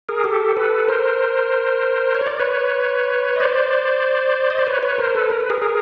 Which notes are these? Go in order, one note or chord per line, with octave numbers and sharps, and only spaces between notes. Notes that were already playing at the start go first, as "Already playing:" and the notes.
G#4 A#4
G4 A4
A4 B4
A#4 C5
C#5
D5
B4 C#5
D#5
C5 D5
D#5
D5
B4 C#5
B4 C#5
A#4 C5
A4 B4
A#4
B4
G#4 A#4
G#4 A#4